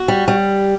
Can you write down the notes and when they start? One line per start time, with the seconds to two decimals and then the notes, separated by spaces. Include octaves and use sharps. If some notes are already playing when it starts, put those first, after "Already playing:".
Already playing: F#4
0.08 G3
0.28 G3